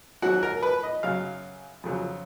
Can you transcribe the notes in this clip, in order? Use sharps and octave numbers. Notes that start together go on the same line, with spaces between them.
G#2 F#3 F#4
A#4
B4
D#5
F#2 C#3 F#3 F5
F2 C#3 F#3